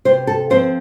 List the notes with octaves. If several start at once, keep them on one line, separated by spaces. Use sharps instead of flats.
C3 C5
A4
F3 C4 C5